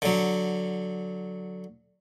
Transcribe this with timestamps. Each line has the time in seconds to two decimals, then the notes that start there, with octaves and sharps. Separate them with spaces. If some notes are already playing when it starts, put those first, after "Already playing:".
0.02 D3 F#3